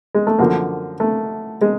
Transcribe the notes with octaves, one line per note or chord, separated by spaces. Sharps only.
G#3
A3
F#2 D3 F3 A#3
A3
G#3